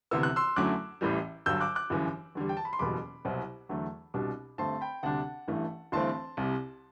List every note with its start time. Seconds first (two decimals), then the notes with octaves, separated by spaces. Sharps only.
0.11 D2 C3 E3 B3 E6
0.23 F#6
0.36 C6 E6
0.56 F#2 D3 F#3 A3 E4 D6 F#6
1.01 A1 A2 E3 G3
1.46 G1 G2 F#3 E6 G6
1.61 D6 F#6
1.75 D6 F#6
1.90 G1 F#2 E3
2.35 E2 D3 G3
2.49 G5
2.57 A5
2.65 B5
2.73 C6
2.79 F#1 E2 B2 G3 B5 D6
3.25 C2 B2 F#3 C4 E4
3.69 E2 D3 F#3 A3
4.14 C2 B2 G3 D4
4.58 G2 D3 A3 C4 A5 C6
4.81 G5 B5
5.03 D2 C3 G3 D4 F#5 A5
5.48 A1 G2 E3 A3
5.92 G1 G2 E3 A3 C4 A5 C6
6.37 C2 C3 G3